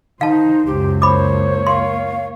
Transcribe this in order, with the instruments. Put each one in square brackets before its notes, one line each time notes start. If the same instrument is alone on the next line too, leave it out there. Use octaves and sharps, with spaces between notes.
[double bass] D#3 [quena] D#4 [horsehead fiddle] C5 [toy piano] F5 A5
[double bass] C#2 F#2 [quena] G4
[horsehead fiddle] A#3 C#5 [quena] C5 [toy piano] B5 D6
[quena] F5 [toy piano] C6